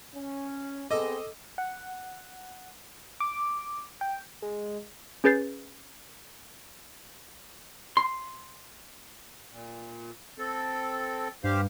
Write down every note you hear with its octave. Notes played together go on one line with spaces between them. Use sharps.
C#4
B3 C4 G#4 A4 D#5 D6
F#5
D6
G5
G#3
C#4 G#4 B4 G6 A6 C7
C6
A#2
C4 A4
G2 G4 C5 F5